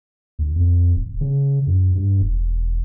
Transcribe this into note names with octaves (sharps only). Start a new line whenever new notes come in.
D2
F2
D1
C#3
F#2
G2
E1